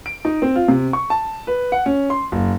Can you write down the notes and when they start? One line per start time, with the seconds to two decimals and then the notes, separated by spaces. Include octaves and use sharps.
0.06 D7
0.25 D#4
0.42 C4
0.56 F4
0.68 C3
0.93 C#6
1.10 A5
1.47 B4
1.72 F#5
1.86 C#4
2.10 C6
2.32 F#1